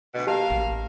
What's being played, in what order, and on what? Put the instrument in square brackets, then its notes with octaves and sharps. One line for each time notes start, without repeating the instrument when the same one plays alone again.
[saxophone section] D2 B2
[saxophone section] A#3 F5 [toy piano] G4 A5
[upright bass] A1